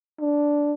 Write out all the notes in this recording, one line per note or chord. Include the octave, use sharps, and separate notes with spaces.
D4